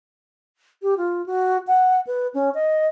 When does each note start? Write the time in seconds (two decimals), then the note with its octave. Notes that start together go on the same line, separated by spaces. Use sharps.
0.82 G4
0.97 F4
1.26 F#4
1.67 F#5
2.07 B4
2.34 C#4
2.54 D#5